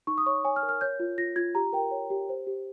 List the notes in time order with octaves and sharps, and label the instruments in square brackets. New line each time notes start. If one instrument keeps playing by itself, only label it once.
[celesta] D#4 C#6
D#6
C#5 C#6
C#5 G#5
F6
A#4
F6
C#5 G6
F4
F4 A#6
F4 G#6
G4 A#5
A#4 G5
C#5
G4
C5
G4